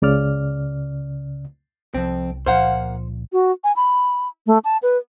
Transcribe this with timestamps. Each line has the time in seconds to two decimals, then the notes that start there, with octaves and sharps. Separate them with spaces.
0.02 C#2 C#3 D5 F6
1.94 C2 F2 C4
2.46 C#2 A#2 F3 A#3 C5 F5 F#5
3.33 F#4
3.64 G#5
3.76 B5
4.47 A3
4.64 A5
4.82 B4